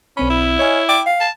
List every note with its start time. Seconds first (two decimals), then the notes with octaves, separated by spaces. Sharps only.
0.17 B1 C4 C#4 B5
0.30 E4
0.59 C#5 D#5 G#5 F6
0.89 G5 D6
1.06 F5
1.20 A5